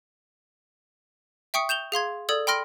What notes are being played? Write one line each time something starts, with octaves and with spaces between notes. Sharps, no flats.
E5 G5 C#6 D#6 C#7
G6 E7 F7 G7
G#4 F5 C6 G#6
A4 D5 D#6 E6 G#6
G5 B5 C6 F6 A#6 D7